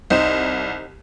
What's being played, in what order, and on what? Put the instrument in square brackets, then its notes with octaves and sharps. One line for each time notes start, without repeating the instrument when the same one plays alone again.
[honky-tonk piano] C2 E7 [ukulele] D#4 G4 C5